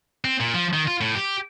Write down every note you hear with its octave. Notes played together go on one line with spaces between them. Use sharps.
C4
A#2
F3
D#3
F4
A2
G4